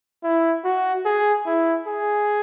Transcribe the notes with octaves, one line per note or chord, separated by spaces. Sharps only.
E4
F#4
G#4
E4
G#4